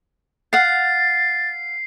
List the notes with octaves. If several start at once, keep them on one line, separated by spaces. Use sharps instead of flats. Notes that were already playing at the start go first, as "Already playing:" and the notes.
F5 F#5 A6 C7